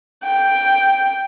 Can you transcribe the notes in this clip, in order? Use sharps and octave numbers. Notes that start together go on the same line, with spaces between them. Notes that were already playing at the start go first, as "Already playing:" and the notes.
G5